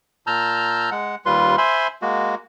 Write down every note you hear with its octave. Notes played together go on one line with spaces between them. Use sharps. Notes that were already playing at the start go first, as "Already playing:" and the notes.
A#2 A5 A#5 E6 F6 G6
G#3 F#5
D#2 G3 F4 B4 C6
C5 E5 G#5 B5 C6
G#3 A#3 F#4